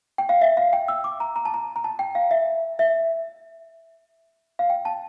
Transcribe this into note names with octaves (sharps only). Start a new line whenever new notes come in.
G5
F5
E5
F5
G5
E6
D6
A#5
A#5
A5
A#5
A#5
A5
G5
F5
E5
E5
F5
G5
A5